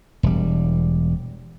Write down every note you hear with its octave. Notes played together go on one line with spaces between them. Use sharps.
E1 G3